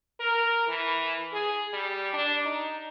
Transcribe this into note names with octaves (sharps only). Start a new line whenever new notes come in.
A#4
E3
G#4
G3
D4
D#4